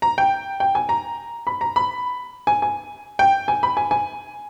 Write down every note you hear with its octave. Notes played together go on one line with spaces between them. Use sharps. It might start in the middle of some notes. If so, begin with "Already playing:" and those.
A#5
G5
G5
G#5
A#5
B5
A#5
B5
G#5
G#5
G5
G#5
B5
G#5
G#5